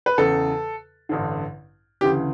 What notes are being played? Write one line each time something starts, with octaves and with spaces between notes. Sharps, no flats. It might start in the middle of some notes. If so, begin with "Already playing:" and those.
B4
E2 C#3 E3 A4
A1 G2 D3
D2 C#3 E3 G4